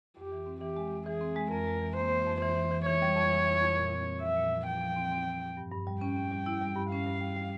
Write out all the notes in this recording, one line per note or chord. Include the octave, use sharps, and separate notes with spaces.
F2 G4
E3
C4
E3 G4
G#3
F2
E3 G#4
C4
G#3
F2 A#4
G#3
E3
A#3 C5
E3
F2
E3 C5
E3
E3
E3 C#5
G3
F2
E3
F2
F2
A#2
C4
C4
F3 E5
A#2
F3
F3 G5
F3
C4
C4
C4
C4
G2
G2
G3
C#4 G5
C#4
G3
E4
G3
G2
C#4 F5
G2
G3
G3